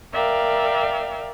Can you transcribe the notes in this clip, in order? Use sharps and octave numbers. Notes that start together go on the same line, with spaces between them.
A#4 D5 E5 F5 G5